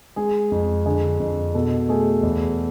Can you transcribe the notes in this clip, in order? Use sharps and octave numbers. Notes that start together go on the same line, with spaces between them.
G#3 G#4
F2
D3 G#4
F2
B2 A4
A3 G#4
E2